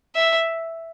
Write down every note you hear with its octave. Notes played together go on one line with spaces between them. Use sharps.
E5